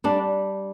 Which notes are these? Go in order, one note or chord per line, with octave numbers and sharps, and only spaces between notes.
G3 D4